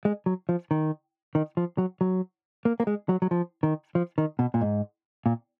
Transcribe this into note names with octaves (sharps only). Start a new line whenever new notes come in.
G#3
F#3
F3
D#3
D#3
F3
F#3
F#3
A#3
A#3
G#3
F#3
F#3
F3
D#3
F3
D#3
B2
A#2
G#2
A#2